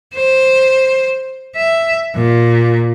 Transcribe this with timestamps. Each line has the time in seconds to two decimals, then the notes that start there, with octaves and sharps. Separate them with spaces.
0.15 C5
1.55 E5
2.15 A#2